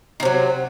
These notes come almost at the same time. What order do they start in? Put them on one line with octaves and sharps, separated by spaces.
D#3 C3 F#3